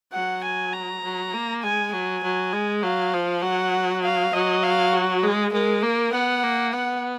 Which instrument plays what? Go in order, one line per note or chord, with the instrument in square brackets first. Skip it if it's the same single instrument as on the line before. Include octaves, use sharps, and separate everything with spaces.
[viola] F#3 [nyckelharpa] F#5
[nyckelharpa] G#5
A#5
[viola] F#3
A#3
[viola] G#3 [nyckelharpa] G#5
[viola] F#3 [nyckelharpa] G#5
[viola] F#3
G#3
[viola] F#3 [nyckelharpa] F5
[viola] F3
[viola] F#3 [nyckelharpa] F#5
[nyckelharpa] F5
[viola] F#3 [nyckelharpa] D#5
[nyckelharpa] F5
F#4
[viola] G#3 [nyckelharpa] G#4
[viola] G#3 [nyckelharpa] A#4
[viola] A#3 [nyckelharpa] A#4
[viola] B3 [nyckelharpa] F#5
[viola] A#3
[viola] B3 [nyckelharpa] F#5